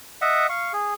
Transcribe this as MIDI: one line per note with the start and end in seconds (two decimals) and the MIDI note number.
0.22 0.47 75
0.22 0.47 76
0.22 0.47 78
0.49 0.72 77
0.49 0.72 85
0.73 0.94 68